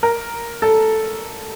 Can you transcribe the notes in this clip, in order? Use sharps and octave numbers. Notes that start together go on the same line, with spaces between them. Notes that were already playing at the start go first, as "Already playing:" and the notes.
A#4
A4